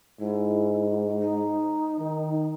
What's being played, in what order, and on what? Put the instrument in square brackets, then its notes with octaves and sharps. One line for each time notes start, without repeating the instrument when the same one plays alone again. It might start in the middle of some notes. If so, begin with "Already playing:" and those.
[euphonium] G#2 [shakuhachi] E4
[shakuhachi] D#4
[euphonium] D#3